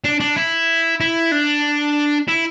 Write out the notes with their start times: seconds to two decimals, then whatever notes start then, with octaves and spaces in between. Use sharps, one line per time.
0.04 D4
0.20 D4
0.36 E4
1.01 E4
1.32 D4
2.28 E4